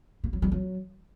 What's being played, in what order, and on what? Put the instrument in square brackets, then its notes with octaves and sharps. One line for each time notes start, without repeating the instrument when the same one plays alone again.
[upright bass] A#3
F#3
G3
F#3